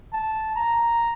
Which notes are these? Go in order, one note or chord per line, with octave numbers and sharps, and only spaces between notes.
A5
A#5